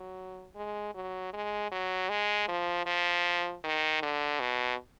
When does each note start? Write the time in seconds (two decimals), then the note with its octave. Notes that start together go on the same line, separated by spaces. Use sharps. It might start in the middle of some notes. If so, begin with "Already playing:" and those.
Already playing: F#3
0.55 G#3
0.94 F#3
1.33 G#3
1.72 F#3
2.09 G#3
2.48 F3
2.86 F3
3.64 D#3
4.02 D3
4.40 B2